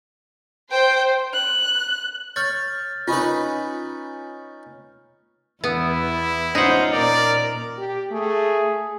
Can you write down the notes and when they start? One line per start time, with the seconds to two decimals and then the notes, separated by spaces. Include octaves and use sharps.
0.72 C5 G5
1.34 F#6
2.36 C#5 F6 G6 A6
3.08 C#4 D#4 F4 B4
5.64 E2 B3 E4
6.55 B3 C#4 D#4 F4 C5 F#5
6.93 A#2 A#4 D5
7.78 G4
8.11 A3 G#4